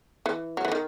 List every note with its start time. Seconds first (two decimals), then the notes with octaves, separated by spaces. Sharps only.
0.26 E3
0.57 F#3
0.65 E3
0.72 D#3